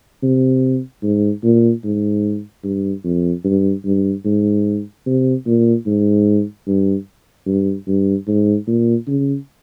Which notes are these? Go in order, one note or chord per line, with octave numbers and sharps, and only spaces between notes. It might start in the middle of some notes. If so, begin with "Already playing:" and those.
C3
G#2
A#2
G#2
G2
F2
G2
G2
G#2
C3
A#2
G#2
G2
G2
G2
G#2
A#2
C#3